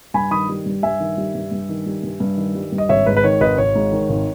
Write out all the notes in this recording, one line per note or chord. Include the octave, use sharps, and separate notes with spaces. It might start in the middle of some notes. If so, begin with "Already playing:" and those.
G2 G#5 B5
D#3 B5 D#6
G3
G2
G2 E5 G#5
D#3
G3
G2
G2
D#3
G3
G2
G2
D#3
G3
G2
D#5
G#1 C#5 E5
G#2 B4
B4
D#3 C#5
G#1 B4 D#5
G#1 C#5
G#2
D#3
G#1